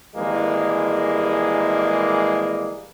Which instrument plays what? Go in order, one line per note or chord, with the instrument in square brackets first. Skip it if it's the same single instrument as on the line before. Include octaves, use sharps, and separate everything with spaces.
[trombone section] G#1 E3 G3 G#3 A#3